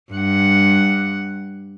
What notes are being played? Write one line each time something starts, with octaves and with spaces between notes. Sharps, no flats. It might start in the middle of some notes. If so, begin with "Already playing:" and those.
G2 F#5